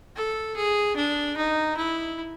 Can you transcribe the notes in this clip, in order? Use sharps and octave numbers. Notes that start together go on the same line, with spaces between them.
A4
G#4
D4
D#4
E4